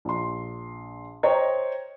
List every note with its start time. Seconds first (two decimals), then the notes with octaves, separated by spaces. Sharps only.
0.05 A#1 C6
1.23 C5 C#5 D#5 G5 A#5 G#6